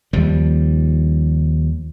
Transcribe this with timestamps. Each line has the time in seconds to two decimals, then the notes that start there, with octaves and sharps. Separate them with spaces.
0.13 D#2 F3 G3